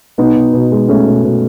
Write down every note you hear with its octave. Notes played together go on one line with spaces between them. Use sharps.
B2 B3 D#4
B2
B2
G#3
G#3 A3 C#4
B2
B2